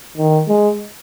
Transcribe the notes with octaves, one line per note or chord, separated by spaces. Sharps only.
D#3
G#3